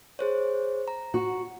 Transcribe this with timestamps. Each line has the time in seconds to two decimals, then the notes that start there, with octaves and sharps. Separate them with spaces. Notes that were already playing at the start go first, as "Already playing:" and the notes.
0.19 G#4 C5 C#5
0.88 A#5
1.14 F#4